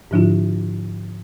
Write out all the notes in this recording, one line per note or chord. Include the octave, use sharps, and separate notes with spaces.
G#2 D3 F3 D4 E4 F4